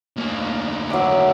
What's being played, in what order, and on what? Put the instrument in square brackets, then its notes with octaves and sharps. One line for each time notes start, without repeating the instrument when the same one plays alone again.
[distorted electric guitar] D2 A#3
[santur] F#3 E5 D6